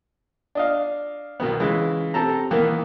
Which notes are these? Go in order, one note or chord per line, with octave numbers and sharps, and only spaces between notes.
D4 D#5 F5
C2 B2 D#3 B3
C#3 E3 G#3
C3 C4 A4 A5 A#5
D#3 E3 A#3 B3